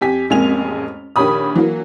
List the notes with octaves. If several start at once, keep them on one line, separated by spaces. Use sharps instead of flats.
F2 G4 G#5 B6
A1 F2 G#3 A#3 G#5 F7
A#1 D#3 G4 C#5 B5 D#6
E3 F#3 A#3